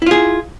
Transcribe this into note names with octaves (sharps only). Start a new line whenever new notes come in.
E4 F4 G#4